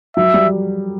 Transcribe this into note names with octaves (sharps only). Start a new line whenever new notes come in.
F#3 E5
G3